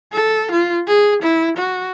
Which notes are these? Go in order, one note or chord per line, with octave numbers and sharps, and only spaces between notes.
A4
F4
G#4
E4
F#4